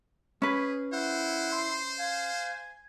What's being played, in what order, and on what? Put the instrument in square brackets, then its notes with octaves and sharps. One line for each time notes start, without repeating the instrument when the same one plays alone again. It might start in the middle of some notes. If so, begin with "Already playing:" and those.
[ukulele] C#4 B4 [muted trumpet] G#4
[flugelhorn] E4 [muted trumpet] C5 [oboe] F#5
[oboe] C6
[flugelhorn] F5 [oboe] G#5